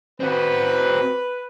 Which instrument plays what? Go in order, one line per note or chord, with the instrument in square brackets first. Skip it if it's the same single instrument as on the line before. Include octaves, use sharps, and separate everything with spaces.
[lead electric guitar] C4 F#4 [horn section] B4